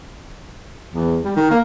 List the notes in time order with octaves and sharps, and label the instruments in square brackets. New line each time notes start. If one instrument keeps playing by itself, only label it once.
[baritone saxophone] E2
G3
D#3
A#3